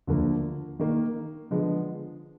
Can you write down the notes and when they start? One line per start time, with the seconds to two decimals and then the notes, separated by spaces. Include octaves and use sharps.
0.07 D2 D3 F3 A#3
0.79 D#3 A#3 D#4
1.51 D3 F3 G#3 B3